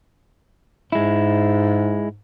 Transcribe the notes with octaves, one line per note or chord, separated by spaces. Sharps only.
G#2 G#3 E4